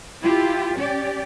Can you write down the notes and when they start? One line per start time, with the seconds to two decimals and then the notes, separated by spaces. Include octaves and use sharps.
0.23 E4 F4 G4
0.77 C#4 G4 D5